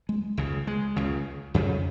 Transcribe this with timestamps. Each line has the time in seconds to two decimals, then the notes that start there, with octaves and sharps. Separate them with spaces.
0.09 G#3
0.37 C#2 C#3
0.67 G#3
0.96 C#2 C#3
1.54 F2 C#3